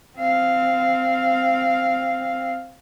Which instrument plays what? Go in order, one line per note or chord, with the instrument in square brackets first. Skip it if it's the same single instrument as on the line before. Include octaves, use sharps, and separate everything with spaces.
[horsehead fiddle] C4 F5